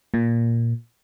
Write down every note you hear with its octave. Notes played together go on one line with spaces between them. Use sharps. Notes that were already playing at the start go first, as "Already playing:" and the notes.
A#2